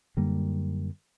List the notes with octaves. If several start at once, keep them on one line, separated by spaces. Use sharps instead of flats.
F#2 D3 G3 A#3